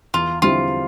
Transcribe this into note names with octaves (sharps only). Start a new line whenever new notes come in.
E2 F4
D3 G3 C4 E4 F4